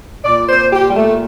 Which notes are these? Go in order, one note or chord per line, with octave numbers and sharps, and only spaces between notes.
A#2 D5
C5
G4
G3
A3